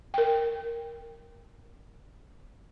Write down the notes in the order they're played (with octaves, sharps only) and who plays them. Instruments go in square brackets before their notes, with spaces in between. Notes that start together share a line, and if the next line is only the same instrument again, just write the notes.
[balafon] A#4 G5